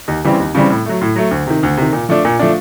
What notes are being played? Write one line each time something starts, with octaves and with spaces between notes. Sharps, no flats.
D#2
C#3 E3 G3 C4
D#2
C#3 E3 G3 C4
A2
F#3 A3
A2
F#3 A3
D2
C3 D#3
D2
C3 D#3
A#2
F3 A3 D4
A#2
F3 A3 D4